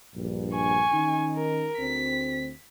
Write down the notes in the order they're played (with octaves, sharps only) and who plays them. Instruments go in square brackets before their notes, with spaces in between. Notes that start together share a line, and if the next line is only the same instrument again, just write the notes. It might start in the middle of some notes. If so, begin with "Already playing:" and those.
[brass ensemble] A#1 G2
[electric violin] G#5 C#6
[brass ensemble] D#3 C#4 D#4
[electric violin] A#4
[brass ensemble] D2 C4 [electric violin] B6